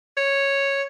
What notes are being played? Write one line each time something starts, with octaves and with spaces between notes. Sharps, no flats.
C#5